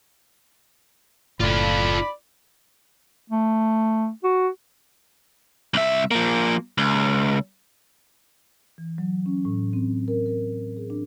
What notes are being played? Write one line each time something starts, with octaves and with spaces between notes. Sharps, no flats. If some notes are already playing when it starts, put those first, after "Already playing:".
F#1 A2 F4 A4 D5 B5
A3
F#4
C2 E5
F3 A#3
C#2
E3
F#3
C#4
A2
C4
A#4
A#4
G#4
D4